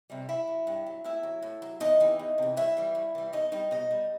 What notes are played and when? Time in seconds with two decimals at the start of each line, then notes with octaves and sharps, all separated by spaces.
0.10 C3 E3 G3
0.29 G2 E4 E5
0.47 F#3
0.67 G2
0.86 F#3
1.04 A2 E4 E5
1.23 F#3
1.42 A2
1.62 F#3
1.80 E2 D#4 D#5
2.00 C3 E3
2.19 E2
2.38 C3 E3
2.57 G2 E4 E5
2.77 E3 G3
2.95 G2
3.15 E3 G3
3.33 B2 D#4 D#5
3.52 G3 D#4 D#5
3.71 B2 D#4 D#5
3.91 G3